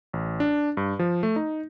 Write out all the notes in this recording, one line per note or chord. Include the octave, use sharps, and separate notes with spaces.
A1
D4
G2
F3
A3
D#4